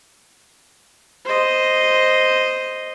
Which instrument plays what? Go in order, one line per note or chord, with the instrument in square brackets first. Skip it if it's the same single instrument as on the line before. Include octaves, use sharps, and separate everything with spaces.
[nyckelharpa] C5 D#5